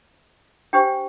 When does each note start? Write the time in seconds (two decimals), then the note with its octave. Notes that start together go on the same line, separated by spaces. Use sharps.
0.73 D4 G4 C5 G5